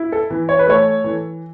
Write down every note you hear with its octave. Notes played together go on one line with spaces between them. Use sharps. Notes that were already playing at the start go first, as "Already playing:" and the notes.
Already playing: E4
A4
E3
C#5
B4
A3 A4 C#5
E3